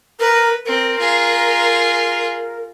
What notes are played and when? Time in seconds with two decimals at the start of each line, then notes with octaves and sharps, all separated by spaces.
0.20 A#4 B4
0.66 C4 A#4
0.99 F4 G#4